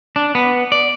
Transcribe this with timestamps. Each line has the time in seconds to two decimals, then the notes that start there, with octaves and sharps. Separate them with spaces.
0.16 D4
0.35 B3
0.72 D5